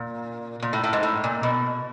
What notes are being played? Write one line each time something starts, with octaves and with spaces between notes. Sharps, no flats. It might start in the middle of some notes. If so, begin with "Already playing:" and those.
Already playing: A#2
A#2
A2
A2
G#2
A2
A#2
B2